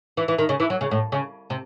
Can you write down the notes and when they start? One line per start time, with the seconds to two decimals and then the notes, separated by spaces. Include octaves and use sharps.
0.17 E3
0.28 E3
0.38 D#3
0.49 C#3
0.60 E3
0.70 F#3
0.81 C#3
0.91 A2
1.12 C#3
1.50 C3